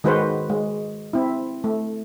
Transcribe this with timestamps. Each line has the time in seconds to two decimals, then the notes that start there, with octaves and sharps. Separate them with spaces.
0.04 D#3 G#3 F#4 B4 C5
0.50 G#3
1.13 C4 E4
1.64 A3